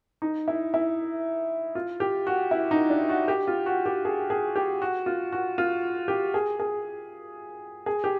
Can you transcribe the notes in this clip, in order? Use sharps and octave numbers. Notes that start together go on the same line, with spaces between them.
D#4
E4
E4
F4
G4
F#4
E4
D#4
D4
F#4
G4
F4
F#4
G4
G#4
G#4
G4
F#4
F4
F#4
F4
G4
G#4
G#4
G#4
G4